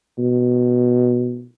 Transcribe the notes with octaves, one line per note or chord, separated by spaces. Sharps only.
B2